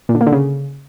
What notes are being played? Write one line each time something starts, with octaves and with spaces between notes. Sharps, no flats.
A#2
D3
A#3
D3
C#3